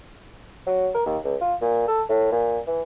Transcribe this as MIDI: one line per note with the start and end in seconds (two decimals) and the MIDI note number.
0.66 0.89 54
0.94 1.01 70
1.06 1.18 39
1.24 1.36 37
1.41 1.55 65
1.61 1.85 46
1.88 2.02 69
2.09 2.30 45
2.32 2.58 46
2.67 2.81 52